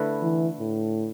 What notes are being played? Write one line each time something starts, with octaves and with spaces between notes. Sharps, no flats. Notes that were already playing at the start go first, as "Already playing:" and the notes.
Already playing: D3 A3 E4 B4
E3
A2